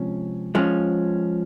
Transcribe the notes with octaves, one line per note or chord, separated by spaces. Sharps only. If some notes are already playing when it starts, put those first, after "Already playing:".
Already playing: C3 F3 G#3 C#4
F3 G#3 C#4